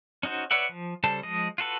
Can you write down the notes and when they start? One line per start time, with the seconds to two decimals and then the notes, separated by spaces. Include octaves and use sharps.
0.23 C#4 D#4 F#4 C5
0.51 B4 C#5 D5 E5 F#5
0.69 F3
1.04 C#3 G3 A4 C5 A5
1.23 F3 G#3 D#5
1.58 F4 F#4 A4 B4